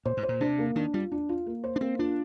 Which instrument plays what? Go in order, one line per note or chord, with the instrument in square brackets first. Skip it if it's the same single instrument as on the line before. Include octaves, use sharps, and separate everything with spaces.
[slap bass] A#2 [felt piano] C5
[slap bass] G#2
[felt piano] C5
[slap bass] A#2
[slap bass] C3 [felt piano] D4
[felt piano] A#3
[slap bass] D#3 [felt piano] D4
[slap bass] G3 [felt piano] F4
[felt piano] D4
F4
A#3
C5
[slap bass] D4
[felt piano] A#3 [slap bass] C4
[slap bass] D4 [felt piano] F4